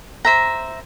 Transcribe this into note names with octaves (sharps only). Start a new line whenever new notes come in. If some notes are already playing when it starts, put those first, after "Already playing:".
C5 E5 A#5